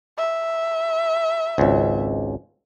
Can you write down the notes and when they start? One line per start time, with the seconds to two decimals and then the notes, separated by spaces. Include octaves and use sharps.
0.17 E5
1.58 G#1 C#2